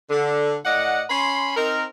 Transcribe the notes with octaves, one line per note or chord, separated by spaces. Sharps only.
D3
A2 D5 D#5 F#5
C#4 G#5 B5 C6
C4 D#4 A#4